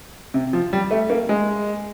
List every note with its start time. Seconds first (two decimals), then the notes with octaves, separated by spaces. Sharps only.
0.34 C3
0.53 F3
0.73 G3
0.91 A3
1.10 A#3
1.29 G#3